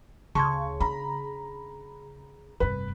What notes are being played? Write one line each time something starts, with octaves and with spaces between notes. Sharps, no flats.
D2 C#3 A5 C6 C#6 G#6
D4 A#5 B5
F1 G2 B4